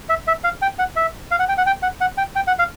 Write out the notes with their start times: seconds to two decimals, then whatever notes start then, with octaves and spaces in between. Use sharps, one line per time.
0.09 E5
0.27 E5
0.44 F5
0.62 G5
0.79 F#5
0.96 E5
1.31 F5
1.40 F#5
1.48 G5
1.58 F#5
1.66 G5
1.83 F#5
2.01 F#5
2.18 G5
2.36 G5
2.47 F#5
2.59 F5